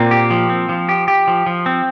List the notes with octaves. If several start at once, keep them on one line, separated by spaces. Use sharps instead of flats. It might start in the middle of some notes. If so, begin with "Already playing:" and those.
Already playing: A#2 A#3 C4
G4
F3
C4
F3
G4
G4
F3
F3
C4